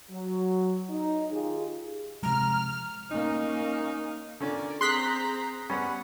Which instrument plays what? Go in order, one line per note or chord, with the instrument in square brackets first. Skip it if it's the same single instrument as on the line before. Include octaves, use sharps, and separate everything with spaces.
[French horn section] F#3
D#4
D#3 F4 G4 G#4
[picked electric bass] C3 F3 G#3 [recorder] A#5 [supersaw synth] F6
[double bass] A#3 C#4 [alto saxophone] D#4
[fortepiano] D3 C#4 [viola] A#4 D5
[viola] C4 A#5 [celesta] G#4 D#6 C7 [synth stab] C6 F#6 B6
[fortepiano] G3 B3 C#4 [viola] F#5 [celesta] C#6